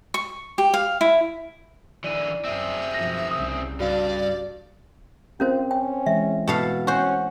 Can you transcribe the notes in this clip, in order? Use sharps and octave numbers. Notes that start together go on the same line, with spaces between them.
C#6
G4
F5
E4
D3 E3 D5 D#7
F#2 C4 G#4 E5
F#2 B2 F3 A#6
C2 C#3 D#6
G2 F#4 D5 F5
C4 C#4 F4 G4 A#4 C5
C#4 G5
E3 G#3 E5
B2 A4 F5
C#4 F#4 C5